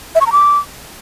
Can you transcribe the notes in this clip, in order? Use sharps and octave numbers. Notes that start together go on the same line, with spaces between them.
E5
C#6
A#5
D6